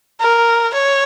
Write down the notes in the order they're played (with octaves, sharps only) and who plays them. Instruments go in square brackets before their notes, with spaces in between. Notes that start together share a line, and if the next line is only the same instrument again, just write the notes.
[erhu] A#4
C#5